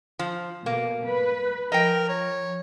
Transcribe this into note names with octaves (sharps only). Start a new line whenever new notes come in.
F3
B2 A#3
B4
F3 A#4 D#5 G5
C#5